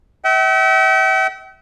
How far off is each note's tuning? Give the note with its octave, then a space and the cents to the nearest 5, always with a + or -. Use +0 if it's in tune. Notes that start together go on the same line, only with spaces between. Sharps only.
E5 -35 G5 -45